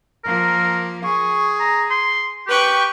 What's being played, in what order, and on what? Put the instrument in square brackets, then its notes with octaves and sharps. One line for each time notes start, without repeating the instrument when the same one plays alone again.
[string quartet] F3 A#3 [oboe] A#4
[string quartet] G#4 [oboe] C#6
[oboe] A#5
C6
[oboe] G4 [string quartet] B4 G5 C#6